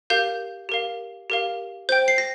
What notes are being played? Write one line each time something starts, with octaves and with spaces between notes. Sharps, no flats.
G4 A#4 F5 G6
G4 A#4 F5
G4 A#4 F5
C5 G5 G6
C7
A#6